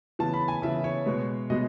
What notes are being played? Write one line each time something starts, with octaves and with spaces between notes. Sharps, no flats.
C#3 E3 B3 A5
B5
G#5
C#3 E3 B3 E5
C#5
B2 G#3 B3
B2 G#3 B3 D#5